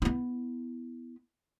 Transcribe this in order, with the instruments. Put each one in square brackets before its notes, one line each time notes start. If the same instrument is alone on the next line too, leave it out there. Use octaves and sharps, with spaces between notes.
[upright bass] B3 E4